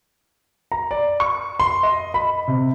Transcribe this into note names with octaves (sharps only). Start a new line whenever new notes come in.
A#5
D5
C#6
C6
D#5
B5
C3